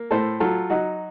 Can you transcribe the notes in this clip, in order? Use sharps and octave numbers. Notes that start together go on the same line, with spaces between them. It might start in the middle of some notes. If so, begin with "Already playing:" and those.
Already playing: A#3
A2 A4 C5
F#3 F4 A4
F#3 D#4 F#4